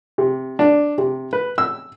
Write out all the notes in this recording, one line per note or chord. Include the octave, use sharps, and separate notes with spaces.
C3
D4
C3
B4
E6